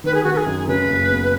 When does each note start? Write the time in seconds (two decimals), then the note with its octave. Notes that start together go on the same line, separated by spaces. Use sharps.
0.04 D#3 B4
0.14 G#4
0.23 D#3 F#4
0.33 B4
0.36 G#4
0.46 F#2
0.67 C#3 B4
0.89 F#1
1.10 B3